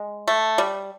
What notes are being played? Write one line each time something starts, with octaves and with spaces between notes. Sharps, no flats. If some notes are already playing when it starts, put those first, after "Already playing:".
Already playing: G#3
A3
G3